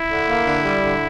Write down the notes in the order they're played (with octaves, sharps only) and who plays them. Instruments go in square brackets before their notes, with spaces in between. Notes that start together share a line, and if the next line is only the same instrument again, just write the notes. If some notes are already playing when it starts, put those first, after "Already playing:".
Already playing: [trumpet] E4
[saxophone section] D3
A#3
D3
G3
D3